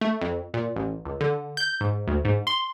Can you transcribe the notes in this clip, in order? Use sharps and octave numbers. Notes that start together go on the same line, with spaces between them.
A3
F2
A#2
A1
C#2
D3
G6
G#2
D2
G#2
C6